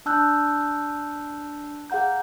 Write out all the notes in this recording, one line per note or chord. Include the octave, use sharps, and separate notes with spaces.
D4 A5 E6 F#6 G6
G#4 F5 F#5 A#5 G6